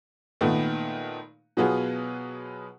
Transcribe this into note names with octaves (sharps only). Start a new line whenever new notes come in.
A#2 D#3 A3 B3
B2 F#3 B3 F4 G#4